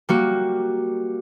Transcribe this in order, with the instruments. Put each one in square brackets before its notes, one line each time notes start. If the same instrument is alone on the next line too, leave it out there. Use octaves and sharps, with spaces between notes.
[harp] G3 A#3 F#4